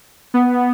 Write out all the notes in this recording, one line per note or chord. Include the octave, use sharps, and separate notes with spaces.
B3